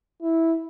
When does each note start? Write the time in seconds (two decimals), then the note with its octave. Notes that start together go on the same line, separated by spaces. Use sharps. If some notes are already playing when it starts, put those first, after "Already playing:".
0.22 E4